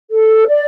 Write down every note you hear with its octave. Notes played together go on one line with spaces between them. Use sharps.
A4
D5